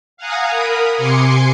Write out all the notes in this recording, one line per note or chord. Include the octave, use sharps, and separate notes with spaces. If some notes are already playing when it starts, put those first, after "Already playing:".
F5 F#5 G#5 A#5 D#6
A#4 B5 D#6
C3 G#5 C6 D6 C#7